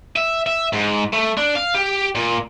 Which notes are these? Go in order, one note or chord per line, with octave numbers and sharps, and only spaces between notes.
E5
E5
G#2
A3
D4
F5
G4
A#2